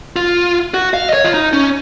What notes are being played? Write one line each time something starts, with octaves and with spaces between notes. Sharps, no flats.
F4
F#4
F5
D#5
C#5
F4
D#4
C#4